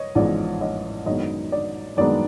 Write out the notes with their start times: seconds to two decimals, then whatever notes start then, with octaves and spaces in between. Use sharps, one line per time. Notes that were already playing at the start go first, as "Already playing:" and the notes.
Already playing: C#5 D#5
0.15 A1 G#2 F3 G#3 B3 D5
0.61 C#5 D#5
1.06 F#2 D#3 G#3 B3 D4 C#5 D#5
1.52 D5
1.97 F#2 D#3 G#3 B3 D4 D5